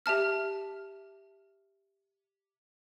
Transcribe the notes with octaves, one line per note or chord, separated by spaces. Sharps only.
G4 E5 A5 F6